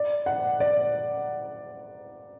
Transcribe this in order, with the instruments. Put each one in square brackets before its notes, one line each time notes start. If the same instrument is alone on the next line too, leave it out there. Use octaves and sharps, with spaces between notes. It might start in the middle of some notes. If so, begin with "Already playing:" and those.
Already playing: [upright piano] D5
F#5
D5